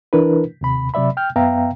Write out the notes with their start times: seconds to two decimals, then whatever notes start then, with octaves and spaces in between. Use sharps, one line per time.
0.13 E3 D4 E4 A#4 B4
0.61 D#2 C3 B5
0.94 C3 F#3 D5 E5 B5
1.17 G5 F6 G6
1.36 F#2 B3 E5 F5 G5 A#5